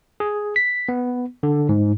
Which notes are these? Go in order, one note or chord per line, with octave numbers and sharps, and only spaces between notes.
G#4
B6
B3
D3
G#2